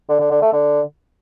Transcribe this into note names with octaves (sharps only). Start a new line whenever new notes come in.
D3
D3
D3
A3
D3